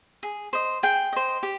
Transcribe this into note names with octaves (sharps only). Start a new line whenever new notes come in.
G#4
C5 D#5
G#4 G5
C5 D#5
G4